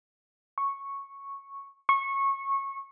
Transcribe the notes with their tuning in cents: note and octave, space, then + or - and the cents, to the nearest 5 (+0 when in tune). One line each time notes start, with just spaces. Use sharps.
C#6 -5
C#6 -20